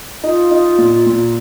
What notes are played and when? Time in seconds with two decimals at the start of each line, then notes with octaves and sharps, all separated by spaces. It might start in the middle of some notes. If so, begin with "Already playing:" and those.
0.23 D#4 F4
0.51 D#4
0.78 A#2
1.07 A#2